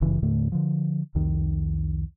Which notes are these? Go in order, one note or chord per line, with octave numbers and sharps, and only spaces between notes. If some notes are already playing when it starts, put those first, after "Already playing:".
G1 F#2 C#3 E3
D#2 A2 D3 A3
D3 F3
C2 F2 D#3